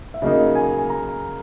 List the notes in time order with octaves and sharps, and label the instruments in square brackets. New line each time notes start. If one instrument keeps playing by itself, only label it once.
[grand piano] E5
[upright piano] C#3 F#3 A#3 D#4 [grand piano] D#5
[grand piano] G#5
G#5
A#5